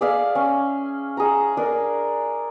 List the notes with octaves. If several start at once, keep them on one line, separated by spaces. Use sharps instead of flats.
G#4 D5 E5 F5
C#4
G#4 A#5
D4 A#4